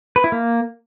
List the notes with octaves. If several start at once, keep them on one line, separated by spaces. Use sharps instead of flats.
B4
E4
A#3